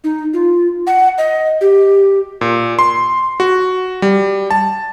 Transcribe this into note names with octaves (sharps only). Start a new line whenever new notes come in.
D#4
F4
F#5
D#5
G4
A#2
C6
F#4
G3
A5